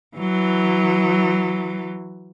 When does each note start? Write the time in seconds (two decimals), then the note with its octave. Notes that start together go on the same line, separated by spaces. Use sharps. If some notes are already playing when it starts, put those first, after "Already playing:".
0.17 E3 F#3